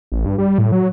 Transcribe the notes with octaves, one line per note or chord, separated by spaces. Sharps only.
A1
G2
G3
A2
F#3